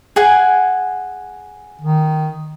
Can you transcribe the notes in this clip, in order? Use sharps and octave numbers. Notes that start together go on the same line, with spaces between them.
G#4 F#5 G#5
D#3